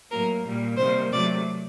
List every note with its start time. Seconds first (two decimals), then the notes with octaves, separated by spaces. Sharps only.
0.11 A2 F#3 A#3 A#4
0.44 A#2 G3 A#3
0.77 C3 D#3 G3 A#3 C5
1.12 C3 F#3 A3 D5